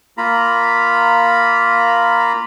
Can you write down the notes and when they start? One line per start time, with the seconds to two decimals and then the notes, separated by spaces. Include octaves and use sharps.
0.18 A#3 F4 A#5 B5